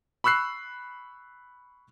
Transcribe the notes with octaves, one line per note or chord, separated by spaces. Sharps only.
B5 C#6 E6 F#6 C7